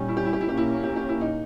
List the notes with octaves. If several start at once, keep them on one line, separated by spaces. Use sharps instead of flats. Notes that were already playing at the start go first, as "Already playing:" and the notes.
Already playing: A#2 G3 C#4 D#4
E4
G4
E4
G4
E4
A#2 A#3 C#4 G4
E4
G4
G4
E4
D#4